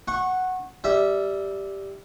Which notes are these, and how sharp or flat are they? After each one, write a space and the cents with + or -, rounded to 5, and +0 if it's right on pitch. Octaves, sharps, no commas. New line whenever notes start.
F#5 +0 C#6 -25
G3 +0 E5 -15